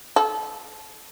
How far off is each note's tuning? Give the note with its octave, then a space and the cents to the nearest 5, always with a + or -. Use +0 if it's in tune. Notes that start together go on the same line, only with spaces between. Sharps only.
A4 -25